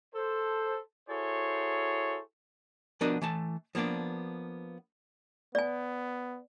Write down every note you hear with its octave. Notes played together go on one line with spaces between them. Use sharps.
A4 C5
E4 F#4 G#4 A4 C5 C#5
F3 B3 D4 F#4 A#4 D#5
E3 A3 A5
F3 A#3 B3 D4 D5
B3 D5 G#5